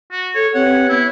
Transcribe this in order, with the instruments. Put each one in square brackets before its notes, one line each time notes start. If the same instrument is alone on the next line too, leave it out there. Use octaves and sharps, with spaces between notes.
[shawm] F#4
[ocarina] A4 [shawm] C#5
[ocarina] C4 [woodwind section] G4 B4 C#5 [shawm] F#5
[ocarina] B3 [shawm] E4